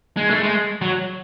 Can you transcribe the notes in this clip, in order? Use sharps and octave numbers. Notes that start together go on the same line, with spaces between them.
G#3
A3
G#3
F#3